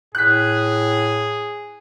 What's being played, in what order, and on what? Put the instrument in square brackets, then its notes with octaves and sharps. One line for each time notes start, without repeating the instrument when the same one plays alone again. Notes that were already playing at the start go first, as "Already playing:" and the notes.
[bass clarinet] A2 [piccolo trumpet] G#4 [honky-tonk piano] F#6 B6